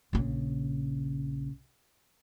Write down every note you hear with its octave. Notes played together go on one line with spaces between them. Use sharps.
A#1 C#3